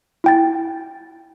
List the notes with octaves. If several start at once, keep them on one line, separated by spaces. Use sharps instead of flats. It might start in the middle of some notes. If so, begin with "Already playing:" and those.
E4 G5 A6